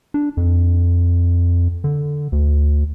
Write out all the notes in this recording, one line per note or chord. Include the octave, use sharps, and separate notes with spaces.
D4
F2
D3
D2